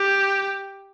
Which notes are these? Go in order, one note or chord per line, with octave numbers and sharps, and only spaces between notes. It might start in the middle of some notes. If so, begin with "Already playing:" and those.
Already playing: G4